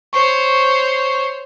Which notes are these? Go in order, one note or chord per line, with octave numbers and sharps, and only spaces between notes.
C5 C#5 C#6